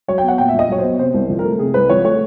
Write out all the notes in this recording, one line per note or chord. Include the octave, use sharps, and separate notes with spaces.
F#3 C#5
G5
B3 F#5
A#2 G5
E5
A#1
D#5
F#3 C#5
B3 C5
C3 C5
C2
F3
A#4
A3
C3 G#4
C2 B4
F3 C#5
A3 C#5